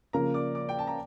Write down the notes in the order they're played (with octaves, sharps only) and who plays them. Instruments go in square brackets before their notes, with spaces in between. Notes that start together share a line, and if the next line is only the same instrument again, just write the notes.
[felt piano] C#3 F3 A#3 [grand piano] A#4 A#5
[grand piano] D5 D6
D5 D6
G5
A5
A#5